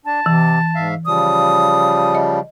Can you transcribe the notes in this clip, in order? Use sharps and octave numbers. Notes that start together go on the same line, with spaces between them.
D4 A5
C3 E3
G#2 E5 F5
C#3 F3 G3 D#6
D#5